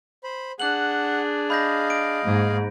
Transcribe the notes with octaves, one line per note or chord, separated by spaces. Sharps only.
C5 B5
D4 G#4 F#5 F#6 F#7
D#5 F5 B5 G6 A#6
D7
G#2 A#3 G#4